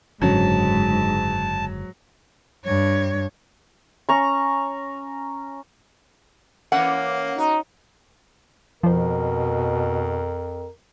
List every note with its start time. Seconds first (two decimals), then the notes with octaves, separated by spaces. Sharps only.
0.22 F#1 G#2 D3 F#3 C#4 A5
2.64 G2 C#5
4.09 C#4 A#5 C#6
6.72 E3 A#3 C#4 F#5
7.38 D#4 F#4
8.83 F2 B2 F3 A#4 C5